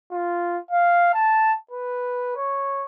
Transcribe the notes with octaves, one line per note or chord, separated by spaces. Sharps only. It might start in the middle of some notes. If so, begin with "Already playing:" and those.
F4
F5
A5
B4
C#5